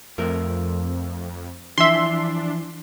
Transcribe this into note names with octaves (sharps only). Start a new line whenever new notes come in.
F2 F3 A3 A#4
E3 F3 D4 E5 C6